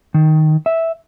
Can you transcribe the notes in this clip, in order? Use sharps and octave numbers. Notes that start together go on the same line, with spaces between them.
D#3
E5